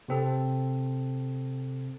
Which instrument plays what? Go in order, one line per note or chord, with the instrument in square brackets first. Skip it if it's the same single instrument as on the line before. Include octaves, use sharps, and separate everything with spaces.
[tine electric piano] C3 C4 A4